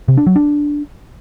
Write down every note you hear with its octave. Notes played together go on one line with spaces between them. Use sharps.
C3
D4
F#3
D4